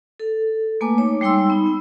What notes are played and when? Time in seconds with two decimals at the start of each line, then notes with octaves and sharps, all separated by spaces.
0.20 A4
0.81 A3 A#3 B4 G#5 D6
0.98 D#4 C#5
1.21 G3 G#3 D#4 G5 C6 E6
1.50 B3 D#4
1.66 B3